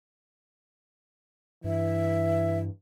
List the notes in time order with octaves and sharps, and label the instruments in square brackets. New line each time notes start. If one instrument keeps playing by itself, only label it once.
[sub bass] G2 [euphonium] E3 [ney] E5